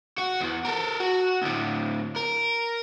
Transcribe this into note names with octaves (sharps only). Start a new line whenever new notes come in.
F#4
E2 E3
A4 A#4
F#4
D2 A2
A#4